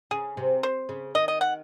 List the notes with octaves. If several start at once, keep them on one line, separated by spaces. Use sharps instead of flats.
C#3 G#4
C3
C5
C#3
D#3 D#5
D#5
F#5